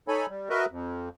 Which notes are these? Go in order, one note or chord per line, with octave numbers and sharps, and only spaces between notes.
D#4 A4 C#5 G#5 B5
G3
F#4 A#4 B4 D#5 E5
F2